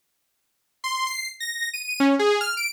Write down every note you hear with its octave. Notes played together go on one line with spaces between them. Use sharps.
C6
C7
A#6
D#7
C#4
G#4
F6
D7